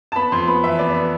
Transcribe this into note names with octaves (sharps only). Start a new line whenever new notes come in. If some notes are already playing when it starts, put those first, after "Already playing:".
A5
B3 B5
F2 C6
B3 B5
E3 E5
B3 D5
B3